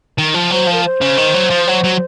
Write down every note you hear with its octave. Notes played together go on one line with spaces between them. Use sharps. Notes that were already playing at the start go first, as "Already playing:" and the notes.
D#3
F3
F#3 C5
F3
A#4
C5
C#3
D#3
F#3
F3
F#3
F#3